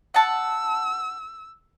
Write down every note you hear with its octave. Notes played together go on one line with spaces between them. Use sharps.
F#5 A5 E6